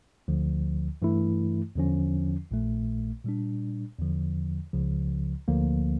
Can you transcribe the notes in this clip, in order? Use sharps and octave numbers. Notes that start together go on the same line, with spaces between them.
D2 D3 F3
G2 E3 A3 E4
E2 D3 F3 C#4
A#1 A#2 A3
A#2 G3 D4
E2 D3 F3
C#2 C#3 F3
D2 D3 F3 A#3